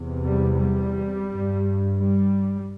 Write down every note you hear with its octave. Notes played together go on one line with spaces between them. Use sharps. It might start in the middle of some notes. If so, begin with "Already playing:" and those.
Already playing: E2 C3
G3
G3
G2
G3